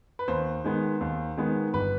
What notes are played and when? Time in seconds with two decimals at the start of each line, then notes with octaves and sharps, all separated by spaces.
0.19 B4
0.28 D#2 C5
0.64 D#3 G#3 B3
1.01 D#2
1.37 D#3 G#3 B3
1.74 G1 B4